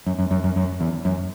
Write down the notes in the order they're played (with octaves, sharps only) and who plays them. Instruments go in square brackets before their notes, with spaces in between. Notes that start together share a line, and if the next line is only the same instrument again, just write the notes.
[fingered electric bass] F#2
F#2
F#2
F#2
F#2
E2
F#2